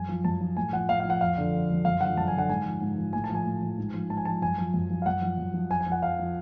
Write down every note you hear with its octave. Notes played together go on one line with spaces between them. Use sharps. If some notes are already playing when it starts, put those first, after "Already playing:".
Already playing: F#2 G#5
F3
F#2 A5
F3
A2 G#5
F3 F#5
A2 F5
F5
F3
F#5
F2 F5
D3 F3
F2
D3 F3
F#2 F5
D3 F3 F#5
F#2 A5
G#5
D3 F3 F#5
G#2 G#5
F3
G#2
F3
A2 G#5
A5
F3
G#5
A2
F3
G#2
F3
G#2 A5
G#5
F3 A5
F#2 G#5
F3
F#2
F3
F5
F#2 F#5
F3
F#2
F3
F2 G#5
G#5
F3
F#5
F2 F5
F3